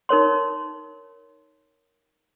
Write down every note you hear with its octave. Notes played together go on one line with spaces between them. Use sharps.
D#4 A#4 C#5 C6